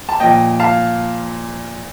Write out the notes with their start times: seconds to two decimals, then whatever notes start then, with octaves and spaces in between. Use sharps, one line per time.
0.09 A5
0.20 A#2 F3 D#5 G5
0.60 F5 A5